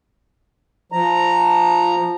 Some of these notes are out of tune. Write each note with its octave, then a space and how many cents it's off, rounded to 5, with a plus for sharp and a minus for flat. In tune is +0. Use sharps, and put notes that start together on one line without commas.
F3 +0 A#5 -5